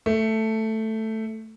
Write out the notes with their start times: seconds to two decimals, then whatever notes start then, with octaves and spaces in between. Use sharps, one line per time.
0.06 A3